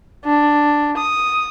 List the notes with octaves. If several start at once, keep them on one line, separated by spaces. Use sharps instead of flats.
D4
D#6